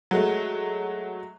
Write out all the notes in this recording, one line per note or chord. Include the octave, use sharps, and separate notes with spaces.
F#3 G#3 A3